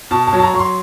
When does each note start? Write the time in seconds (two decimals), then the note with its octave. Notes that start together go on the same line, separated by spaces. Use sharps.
0.11 B2 A5
0.27 A5
0.33 F#3
0.39 A5
0.43 A#5
0.54 F#3 C#6
0.59 C6